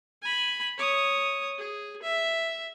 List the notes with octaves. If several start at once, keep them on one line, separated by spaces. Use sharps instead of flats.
G#5 B5
C#5 D#6
G#4
E5